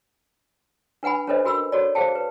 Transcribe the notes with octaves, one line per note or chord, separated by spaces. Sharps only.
D4 B4 F#5 G#5 B5
C#4 D4 A4 B4 C5 D#5
F#4 A#4 B5 E6
F#4 A4 C#5 D5
G#4 C5 F5 G5 A5
B4